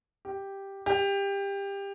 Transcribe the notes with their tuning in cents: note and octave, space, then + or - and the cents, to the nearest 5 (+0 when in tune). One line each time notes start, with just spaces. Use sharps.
G4 +0
G4 +20